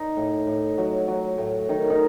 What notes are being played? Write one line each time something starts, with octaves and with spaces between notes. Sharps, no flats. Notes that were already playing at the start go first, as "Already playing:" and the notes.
Already playing: D#4
A2
A2
F#3
F#3
A2
D#3 D#4
D#4